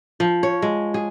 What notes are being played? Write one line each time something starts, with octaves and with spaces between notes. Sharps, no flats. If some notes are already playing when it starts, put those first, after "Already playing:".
F3
C#5
G#3
G#4